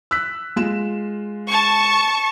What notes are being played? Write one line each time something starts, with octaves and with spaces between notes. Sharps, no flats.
E6 F#6 B6
G#3 F4 E7
A5 C#6